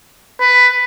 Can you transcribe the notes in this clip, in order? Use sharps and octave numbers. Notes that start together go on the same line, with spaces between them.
B4